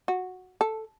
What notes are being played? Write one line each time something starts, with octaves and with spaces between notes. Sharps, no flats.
F#4
A4